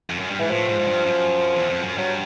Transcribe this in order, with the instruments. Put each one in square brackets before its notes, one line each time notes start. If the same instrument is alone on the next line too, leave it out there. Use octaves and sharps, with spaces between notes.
[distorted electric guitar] F2
F#2
G2
[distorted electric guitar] G#2 [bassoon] E3
[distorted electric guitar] A2 [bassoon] F3
[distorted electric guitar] G#2
G#2
G2
F#2
E2
F2
F#2
[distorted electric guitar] G2 [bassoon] F#3